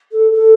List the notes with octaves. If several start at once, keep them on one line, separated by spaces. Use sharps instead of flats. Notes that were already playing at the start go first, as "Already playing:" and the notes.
A4
A4